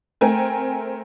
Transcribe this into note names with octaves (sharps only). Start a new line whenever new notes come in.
A3 C4 A#4 G5 G#5